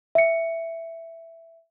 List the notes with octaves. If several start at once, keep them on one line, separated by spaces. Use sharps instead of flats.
E5 C#7